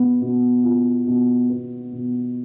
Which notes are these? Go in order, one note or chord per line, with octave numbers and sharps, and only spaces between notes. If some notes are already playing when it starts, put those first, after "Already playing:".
Already playing: B2 B3
B2
F4
B2
B3
B2